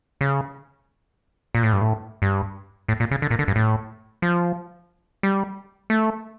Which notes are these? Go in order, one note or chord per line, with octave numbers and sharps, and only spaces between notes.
C#3
A#2
A2
G2
A2
G2
A2
A#2
C#3
D3
A#2
D3
G2
A2
F3
G3
A3